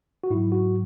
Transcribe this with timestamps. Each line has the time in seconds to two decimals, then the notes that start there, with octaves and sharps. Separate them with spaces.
0.24 F#4
0.30 G#2 F#3 E4
0.52 F#4